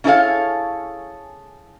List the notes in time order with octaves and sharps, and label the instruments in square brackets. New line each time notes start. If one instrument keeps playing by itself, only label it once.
[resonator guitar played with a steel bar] C#4 E4 G#4 A4 C#5 F5